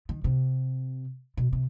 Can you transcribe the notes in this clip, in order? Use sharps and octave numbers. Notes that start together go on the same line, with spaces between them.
D#3
C3
B2
C3